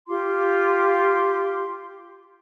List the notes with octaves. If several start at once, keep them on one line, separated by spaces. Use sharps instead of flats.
F4 G4 C6 D6